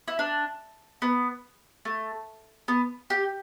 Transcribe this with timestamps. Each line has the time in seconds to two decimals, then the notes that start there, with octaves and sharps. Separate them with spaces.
0.08 E4
0.19 D4
1.02 B3
1.85 A3
2.68 B3
3.10 G4